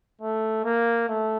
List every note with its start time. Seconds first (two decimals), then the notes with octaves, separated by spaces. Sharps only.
0.21 A3
0.64 A#3
1.08 A3